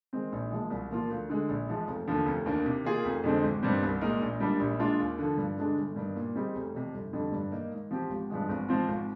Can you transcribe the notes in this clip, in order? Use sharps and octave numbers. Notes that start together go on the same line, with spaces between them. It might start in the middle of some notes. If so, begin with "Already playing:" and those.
D#3 G#3 C4
A#1
A#2 F3 G#3
C2
A#2 F3 A#3 F4
D2
D3 G#3
A#1
G#2 F3 G#3
F1
D#2 D3 F3
F1
D#2 D#3 A#3 D4
C3
D#3 A#3 F4 G#4
F1
F2 D3 G#3 C4
G#1
G2 D#3 G3 C4
C2
A#2 G#3 D#4 A#4
A#1
G#2 G3 A#3 D4
A#1
A#2 G#3 D4 F4
D#2
D3 F3
G2
D3 G#3 D4
G1
G2 D#3
A#2
G3 C4 D#4 G#4
F1
F2 C3
G1
F2 D3 G3
G2
D#3 A#3 D#4
G#2
F3 C4 G4
G#1
G2 F3 G#3
G#1
G#2 F3 C4 F4
G#1